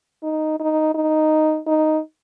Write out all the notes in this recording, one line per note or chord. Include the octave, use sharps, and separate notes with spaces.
D#4
D#4
D#4
D#4